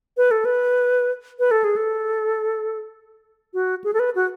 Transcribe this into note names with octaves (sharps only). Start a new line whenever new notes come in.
B4
A4
B4
B4
A4
G#4
A4
F#4
G#4
A4
B4
F#4